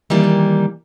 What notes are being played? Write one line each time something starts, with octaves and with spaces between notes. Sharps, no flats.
D#3 E3 G3 A#3